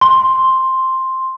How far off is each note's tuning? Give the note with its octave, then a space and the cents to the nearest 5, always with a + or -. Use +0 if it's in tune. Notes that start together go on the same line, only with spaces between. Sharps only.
C6 +5